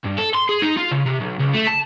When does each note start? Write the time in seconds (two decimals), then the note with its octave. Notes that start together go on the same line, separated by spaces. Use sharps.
0.04 G2
0.18 A4
0.34 C6
0.49 G#4
0.62 D#4
0.77 F4
0.91 C#3
1.06 C3
1.21 B1
1.40 C#2
1.54 A3
1.68 A5